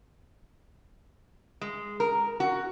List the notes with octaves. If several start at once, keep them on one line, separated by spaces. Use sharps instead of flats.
G#3
A#4
F#4